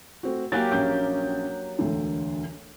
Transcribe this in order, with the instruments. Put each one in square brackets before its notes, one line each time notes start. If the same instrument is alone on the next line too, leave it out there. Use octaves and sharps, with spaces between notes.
[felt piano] A3 C4 F#4
[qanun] F#3 A#3 G4 [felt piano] G#5 F#6 A6
[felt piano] A#1 C#4 G6
E1 D2 D3